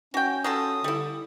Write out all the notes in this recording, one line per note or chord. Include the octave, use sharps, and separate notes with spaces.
C#4 F#4 G5
F#3 F4 A4 D#6
D3 G3 E4